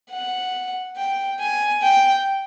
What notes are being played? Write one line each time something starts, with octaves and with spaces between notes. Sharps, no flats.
F#5
G5
G#5
G5